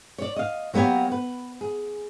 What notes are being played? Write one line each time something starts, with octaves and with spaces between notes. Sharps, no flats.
C#5 D5
D#5 F5
F#3 A#3 B3 G4 C#5
B4
G#4